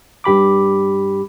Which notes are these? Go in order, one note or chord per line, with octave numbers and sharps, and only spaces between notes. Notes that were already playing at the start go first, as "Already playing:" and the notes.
G2 G4 B5 D6